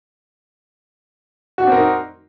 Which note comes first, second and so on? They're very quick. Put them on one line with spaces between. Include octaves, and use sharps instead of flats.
F#4 D4 C4 A#4 D#4